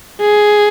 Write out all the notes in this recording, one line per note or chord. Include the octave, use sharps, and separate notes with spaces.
G#4